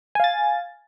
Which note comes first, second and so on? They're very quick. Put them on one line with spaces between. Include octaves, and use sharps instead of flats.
G#5 F5 A6